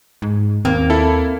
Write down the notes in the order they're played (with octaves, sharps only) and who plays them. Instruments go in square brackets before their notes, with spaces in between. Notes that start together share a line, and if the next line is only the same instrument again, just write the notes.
[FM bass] G#2
[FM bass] D#2 [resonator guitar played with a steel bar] A#3 [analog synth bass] C4
[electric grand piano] E4 A4